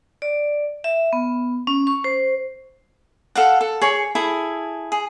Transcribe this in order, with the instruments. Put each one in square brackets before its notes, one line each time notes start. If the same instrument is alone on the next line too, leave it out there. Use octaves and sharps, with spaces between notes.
[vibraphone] D5
E5
B3
C#4
C#6
C5
[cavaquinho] A4 F5 F#5
A4
G#4 C#5
E4 G#4 A4
G#4